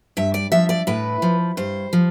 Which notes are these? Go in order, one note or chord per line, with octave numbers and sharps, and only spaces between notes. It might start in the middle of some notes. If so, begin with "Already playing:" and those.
G2 E5
D5
F3 E5
D5
A2 B4
F3
G2 C5
F3